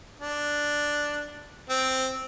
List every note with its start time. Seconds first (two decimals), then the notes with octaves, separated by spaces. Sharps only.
0.20 D4
1.69 C4